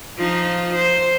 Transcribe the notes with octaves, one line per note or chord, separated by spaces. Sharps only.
F3 D#4 F4
C5